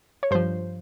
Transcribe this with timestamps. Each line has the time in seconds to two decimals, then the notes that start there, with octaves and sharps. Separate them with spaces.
0.23 C#5
0.31 G2 F3 C5